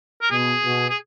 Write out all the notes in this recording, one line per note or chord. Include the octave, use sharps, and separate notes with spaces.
A#4
B2 G#4
B2
G#4